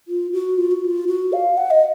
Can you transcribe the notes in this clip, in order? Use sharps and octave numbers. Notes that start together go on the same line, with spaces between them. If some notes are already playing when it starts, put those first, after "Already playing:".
F4
F#4
F4
F#4
F4
F#4
F5
F#5
D#5